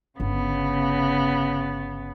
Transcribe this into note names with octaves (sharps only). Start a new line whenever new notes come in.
G1 C#3 B3